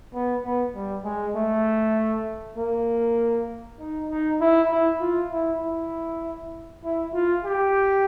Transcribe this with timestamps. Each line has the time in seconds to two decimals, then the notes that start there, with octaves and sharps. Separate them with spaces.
0.14 B3
0.44 B3
0.75 G3
1.04 G#3
1.35 A3
2.57 A#3
3.80 D#4
4.09 D#4
4.40 E4
4.71 E4
5.01 F4
5.32 E4
5.62 E4
6.84 E4
7.14 F4
7.45 G4